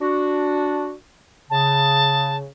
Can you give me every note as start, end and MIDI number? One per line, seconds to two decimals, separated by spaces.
0.01 0.93 62
0.01 0.93 66
1.50 2.48 49
1.50 2.37 81